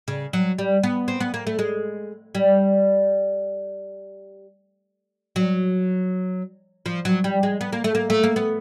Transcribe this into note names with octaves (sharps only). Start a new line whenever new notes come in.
C#3
F#3
G3
B3
C4
B3
A#3
A3
G#3
G3
F#3
F3
F#3
G3
G#3
B3
A#3
A3
A#3
A3
A#3
B3